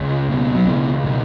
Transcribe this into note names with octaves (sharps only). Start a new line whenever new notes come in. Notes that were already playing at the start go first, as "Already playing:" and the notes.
Already playing: C#2
B2
F#3
C#2 E3
B2